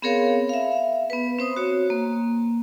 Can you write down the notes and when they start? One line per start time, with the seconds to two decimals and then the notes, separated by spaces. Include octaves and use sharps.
0.02 B3 C4 G#4 A#4 C#5 F5
0.49 E5 F5
1.10 B3 B4
1.39 C4 C5 D#6
1.56 F#4 C#5
1.90 A#3